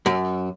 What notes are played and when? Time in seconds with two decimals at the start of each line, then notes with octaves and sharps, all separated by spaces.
0.06 F#2